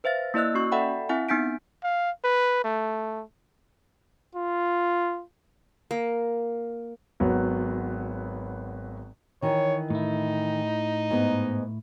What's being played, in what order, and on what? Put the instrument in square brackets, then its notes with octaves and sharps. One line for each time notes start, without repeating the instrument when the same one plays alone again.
[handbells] B4 C5 E5 F5 A6
A#3 E4 D5 D#5 E6 F#6
A#3 C#4 F#4 C#6
A4 D5 E5 F#5 G5 B5
C4 E4 E5 F#5 G#5
B3 D#4 G#5 G6 B6 D7
[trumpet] F5
B4
A3
[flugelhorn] F4
[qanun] A#3
[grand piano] G#1 F#3 B3
[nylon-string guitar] D#3 E3 [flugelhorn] C#5
[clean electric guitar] A2 E4 [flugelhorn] D#4
[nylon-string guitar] G#2 B3